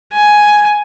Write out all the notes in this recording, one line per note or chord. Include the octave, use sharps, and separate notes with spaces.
G#5